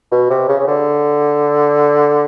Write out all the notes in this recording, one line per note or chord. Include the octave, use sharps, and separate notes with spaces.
B2
C3
C#3
C#3
D3